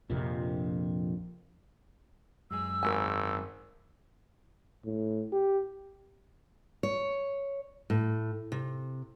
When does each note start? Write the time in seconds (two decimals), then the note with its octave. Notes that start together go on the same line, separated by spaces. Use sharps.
0.10 A#1 F2 C3
2.51 F#2 G#3 G#4 E6
2.83 G#1 A#4 G#5
4.85 A2
5.33 G4
6.83 C#5
7.90 A2
8.52 C3